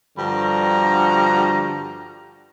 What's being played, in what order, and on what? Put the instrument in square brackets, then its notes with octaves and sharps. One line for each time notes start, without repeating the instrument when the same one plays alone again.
[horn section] G2 D3 F3 F#4 A#5